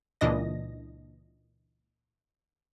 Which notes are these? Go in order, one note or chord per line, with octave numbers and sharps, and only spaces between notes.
C#2 A#2 E3 D4 D#5 A#6